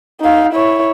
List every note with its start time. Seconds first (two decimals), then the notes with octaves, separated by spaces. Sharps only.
0.21 D#4 F5
0.53 E4 C#5